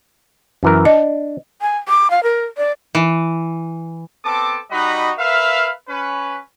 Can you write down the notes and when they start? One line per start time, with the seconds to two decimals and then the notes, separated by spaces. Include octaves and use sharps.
0.63 F#2 E3 A#4
0.85 D4 D#5
1.61 G#5
1.88 D6
2.10 F5
2.23 A#4
2.57 D5
2.95 E3
4.24 B3 C4 A4 A5 D6
4.71 G3 D#4 F#4 B4 D#5 B5
5.18 A#4 B4 E5 F5
5.89 C#4 B4